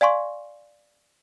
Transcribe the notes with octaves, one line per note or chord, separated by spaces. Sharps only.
D5 F5 G#5 C6 C#6